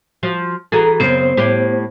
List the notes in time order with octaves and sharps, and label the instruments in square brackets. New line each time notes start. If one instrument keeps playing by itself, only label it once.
[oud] F3 F#4
[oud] E3 F#4 G#4 [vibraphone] A4 A#5
[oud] F#2 C#3 C4 [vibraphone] B3 C5
[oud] A2 G4